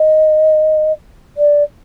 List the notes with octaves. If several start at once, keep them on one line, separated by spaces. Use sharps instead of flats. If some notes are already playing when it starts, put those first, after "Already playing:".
Already playing: D#5
D5